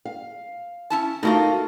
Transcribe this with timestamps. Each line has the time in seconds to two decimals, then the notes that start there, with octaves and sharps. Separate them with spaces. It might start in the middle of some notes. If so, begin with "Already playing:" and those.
0.05 F5
0.90 C#4 E4 A5
1.23 B2 A3 A#3 D#4 F4 F#4